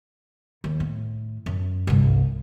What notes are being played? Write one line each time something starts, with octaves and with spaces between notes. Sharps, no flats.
D#2
A2
F#2
G1 C2